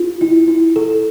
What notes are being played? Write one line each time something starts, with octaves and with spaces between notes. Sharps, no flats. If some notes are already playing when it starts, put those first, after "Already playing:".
Already playing: F4
E4
E4
A4